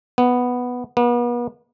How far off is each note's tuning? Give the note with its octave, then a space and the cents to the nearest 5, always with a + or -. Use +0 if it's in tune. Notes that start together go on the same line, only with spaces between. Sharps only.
B3 +0
B3 -40